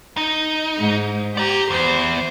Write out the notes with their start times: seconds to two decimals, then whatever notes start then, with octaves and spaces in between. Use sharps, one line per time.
0.17 D#4
0.77 G#2
1.37 G4 D5 A#5
1.71 E2 C5